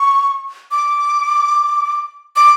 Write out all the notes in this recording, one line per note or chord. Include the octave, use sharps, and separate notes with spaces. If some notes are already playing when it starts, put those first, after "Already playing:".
Already playing: C#6
D6
D6